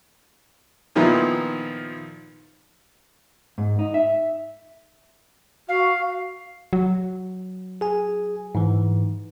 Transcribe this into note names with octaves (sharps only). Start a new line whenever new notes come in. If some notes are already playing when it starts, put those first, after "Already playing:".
A#2 D#3 F3 B3 E4
G#2
D#4
E5
F#4 F5
F#3
G#4 G#5
G#2 E3